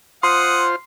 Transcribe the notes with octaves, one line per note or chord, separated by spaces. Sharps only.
F4 C5 F#5 C6 D#6